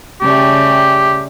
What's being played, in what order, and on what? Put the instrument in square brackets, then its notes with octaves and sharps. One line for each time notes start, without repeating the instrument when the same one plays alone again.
[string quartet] C#3 G3 A3 [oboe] G4